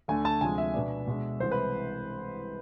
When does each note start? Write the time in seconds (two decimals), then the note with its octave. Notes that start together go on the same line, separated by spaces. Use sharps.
0.08 D2 D3 A3 G#5
0.25 A5
0.41 D2 C3 F3 G#3 G#5
0.58 E5
0.74 B2 B3 D4
1.07 B2 G#3 D4
1.40 C2 C3 E3 G#3 C5
1.51 B4